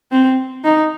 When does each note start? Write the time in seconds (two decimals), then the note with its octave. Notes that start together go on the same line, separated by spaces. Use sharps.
0.12 C4
0.64 D#4